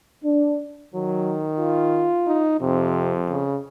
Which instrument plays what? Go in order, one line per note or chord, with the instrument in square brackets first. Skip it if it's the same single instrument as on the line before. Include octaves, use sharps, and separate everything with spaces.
[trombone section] D4
[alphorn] D#3 [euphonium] F#3
[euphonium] F4
[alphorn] D#4
[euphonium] F2 [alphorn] C3
[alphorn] C#3